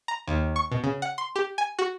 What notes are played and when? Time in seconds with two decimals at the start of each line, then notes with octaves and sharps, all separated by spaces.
0.08 A#5
0.28 D#2
0.56 C#6
0.72 B2
0.84 C#3
1.02 F#5
1.18 C6
1.36 G4
1.58 G#5
1.79 F#4